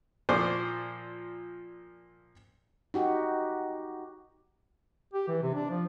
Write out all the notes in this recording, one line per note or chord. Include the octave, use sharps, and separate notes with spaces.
A#2 F3 C5 D5 C#6 D6
D#4 F#4 G4
G4
E3
C3
D4
F3